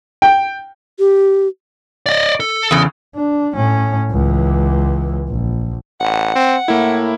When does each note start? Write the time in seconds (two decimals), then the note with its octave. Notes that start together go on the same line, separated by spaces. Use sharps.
0.22 G5
0.99 G4
2.06 D5 D#5
2.40 A4
2.71 E2 C#3
3.15 D4
3.55 A2 C#4
4.11 C#2 E3
5.29 A#1
6.01 A1 F#5
6.35 C4
6.68 A2 A#3 E4